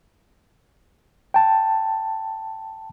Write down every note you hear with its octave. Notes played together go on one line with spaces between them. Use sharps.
G5 A5